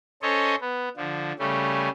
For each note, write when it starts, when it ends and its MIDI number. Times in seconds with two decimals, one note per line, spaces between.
0.22 0.55 61
0.22 0.55 69
0.22 0.55 72
0.22 0.55 73
0.22 0.55 75
0.61 0.89 59
0.97 1.32 50
0.97 1.32 53
1.39 1.89 49
1.39 1.89 55
1.39 1.89 57
1.39 1.89 61